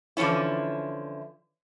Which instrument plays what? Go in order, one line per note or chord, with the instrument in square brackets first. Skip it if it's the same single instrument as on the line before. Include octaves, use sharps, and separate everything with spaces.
[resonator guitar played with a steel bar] D3 E3 F3 C#4 E4